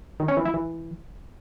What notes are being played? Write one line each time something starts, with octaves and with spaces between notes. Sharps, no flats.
D#3
C#4
E3
E4
E3